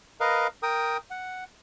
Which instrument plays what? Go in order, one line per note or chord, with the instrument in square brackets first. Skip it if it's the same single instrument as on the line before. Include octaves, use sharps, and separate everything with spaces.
[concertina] A#4 B4 D#5 F5
A#4 G5 D#6
F#5